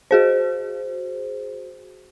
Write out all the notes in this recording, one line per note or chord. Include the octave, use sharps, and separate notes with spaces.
F#4 G#4 C5